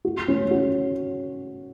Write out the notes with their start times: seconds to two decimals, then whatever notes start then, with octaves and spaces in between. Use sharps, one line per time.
0.05 F#4
0.28 C#4
0.51 F#4